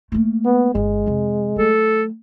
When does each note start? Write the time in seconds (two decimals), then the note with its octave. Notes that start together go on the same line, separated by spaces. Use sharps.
0.12 A3 A#3
0.45 B3
0.75 G1 G#3
1.06 F2 C3
1.56 F#3 A3 A4